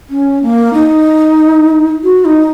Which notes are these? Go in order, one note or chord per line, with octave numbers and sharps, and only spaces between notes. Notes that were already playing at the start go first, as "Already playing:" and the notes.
C#4
A#3
D#4
F#4
D#4